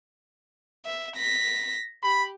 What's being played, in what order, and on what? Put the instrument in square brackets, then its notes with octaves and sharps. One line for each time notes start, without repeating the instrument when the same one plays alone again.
[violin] E5
A#6 B6
[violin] G4 [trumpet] B5